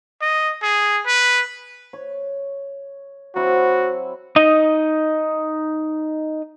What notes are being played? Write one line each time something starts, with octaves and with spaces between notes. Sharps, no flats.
D#5
G#4
B4
C#5
F#3 C4 E4 F#4
D#4 D#5